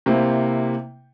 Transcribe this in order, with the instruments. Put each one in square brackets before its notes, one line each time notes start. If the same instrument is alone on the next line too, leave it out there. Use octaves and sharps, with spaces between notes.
[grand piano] C3 A#3 C4 E4